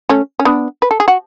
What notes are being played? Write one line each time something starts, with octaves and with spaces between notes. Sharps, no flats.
A3 C#4
C#4
B3 D4
B4
A4
G#4
F#4